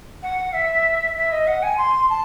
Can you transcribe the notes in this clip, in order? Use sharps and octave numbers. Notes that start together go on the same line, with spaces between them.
F#5
E5
E5
D#5
F#5
G#5
C6
A5